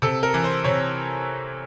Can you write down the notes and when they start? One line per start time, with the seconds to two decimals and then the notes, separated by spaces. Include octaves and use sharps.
0.02 C3 A4
0.23 A#4
0.34 E3
0.44 C5
0.64 C3 C#5